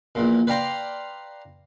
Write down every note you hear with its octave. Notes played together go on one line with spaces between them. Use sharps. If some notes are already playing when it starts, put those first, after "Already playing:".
A#1 E2 A#2
B4 D5 F5 G5 A#5 C6